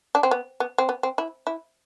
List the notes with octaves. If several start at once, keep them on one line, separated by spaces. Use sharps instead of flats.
D4
C4
B3
B3
C4
B3
C4
E4
E4